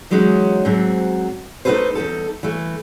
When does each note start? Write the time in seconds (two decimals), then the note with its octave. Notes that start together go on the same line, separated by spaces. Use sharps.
0.10 E3 F#3 G#3 C#4 D#4
0.65 G#2 F#3 C4
1.65 A3 D#4 F4 A4 B4 C5
1.95 E2 G2 D#4 A4
2.43 E3 A3